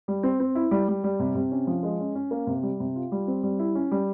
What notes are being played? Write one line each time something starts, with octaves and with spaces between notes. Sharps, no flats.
G3
C4
C4
E4
G3
G3
G3
C3
C3
C#4
F3
G#3
C#4
C#4
A#3
C3
G3
C3
F4
G3
C4
G3
E4
C#4
G3